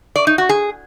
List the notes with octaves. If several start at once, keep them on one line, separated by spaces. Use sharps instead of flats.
D5
D#4
F#4
G#4